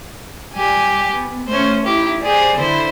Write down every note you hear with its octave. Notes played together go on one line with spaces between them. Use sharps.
G3 G4 G#5
B3
A3 C#4 C5
D#4 E4 G4
G4 G#4 C5 D5
D3 E4 C5